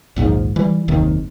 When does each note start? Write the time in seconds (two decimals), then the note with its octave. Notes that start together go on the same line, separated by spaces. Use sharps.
0.16 A#1 D#2 G#2 F3
0.56 E3 G3
0.88 F#1 D#2 C3 D#3